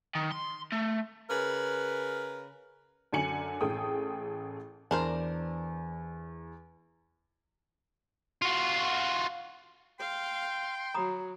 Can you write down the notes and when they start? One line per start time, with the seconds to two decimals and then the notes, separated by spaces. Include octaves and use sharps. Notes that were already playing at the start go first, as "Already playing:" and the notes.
0.15 D#3
0.32 C6
0.72 A3
1.30 C#3 A#4 B4
3.13 F#2 D3 G#5 C#7 F#7
3.61 A1 G#4 A4 G5 D#6
4.91 E2 D4 A#4 C5
8.42 F4 F#4
9.99 F5 G5 C6
10.94 F#3 A#5 B5 D#6